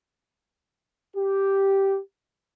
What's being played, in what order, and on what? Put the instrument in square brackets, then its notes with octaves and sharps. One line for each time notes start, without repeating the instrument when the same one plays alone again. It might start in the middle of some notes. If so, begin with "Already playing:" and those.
[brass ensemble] G4